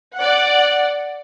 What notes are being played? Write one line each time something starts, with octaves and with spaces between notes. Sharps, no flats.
D5 F#5